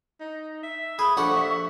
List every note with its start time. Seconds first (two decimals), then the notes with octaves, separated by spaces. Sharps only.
0.20 D#4
0.63 E5
0.99 G#4 B5
1.17 A#1 G4 A4 F#5 C#6
1.36 E5